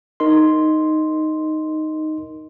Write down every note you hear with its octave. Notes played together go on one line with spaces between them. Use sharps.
D#4 A#4 D#5 C6